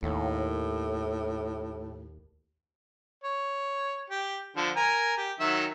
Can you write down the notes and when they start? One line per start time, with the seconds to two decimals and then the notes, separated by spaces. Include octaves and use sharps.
0.03 D#2 A2
3.23 C#5
4.10 G4
4.56 D3 F3 A4
4.76 A#4 G#5 A#5
5.17 G4
5.40 D#3 F#3 E5